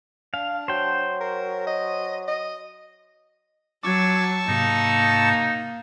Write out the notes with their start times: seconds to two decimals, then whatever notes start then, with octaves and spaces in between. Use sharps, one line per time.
0.34 D4 F5
0.68 F#3 C5 G5
1.20 A#4
1.67 D#5
2.28 D#5
3.83 F#3 A5 C#6 D6 E6 G#6
4.48 G#2 C3 A#3 D#4